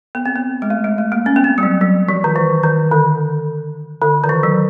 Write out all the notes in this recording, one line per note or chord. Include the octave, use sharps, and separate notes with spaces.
B3
C4
B3
G#3
A3
G#3
A3
A#3
C#4
B3
C4
G3
F#3
F#3
F3
D#3
E3
D#3
D3
D3
D#3
E3
F#3